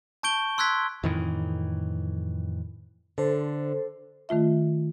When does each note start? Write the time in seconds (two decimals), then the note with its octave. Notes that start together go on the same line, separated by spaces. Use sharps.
0.23 A5 C#6 G6 D7 G7
0.58 C6 E6 F#6 G#6 B6
1.03 F2 A2 D#3 E3
3.18 D3 A4 C5
4.29 D#3 A3 F4 E5